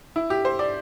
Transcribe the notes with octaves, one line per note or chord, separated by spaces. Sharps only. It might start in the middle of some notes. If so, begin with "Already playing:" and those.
E4
G4
C5
D5